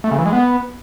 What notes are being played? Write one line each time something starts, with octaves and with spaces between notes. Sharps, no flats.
A3
C#3
E3
G#3
B3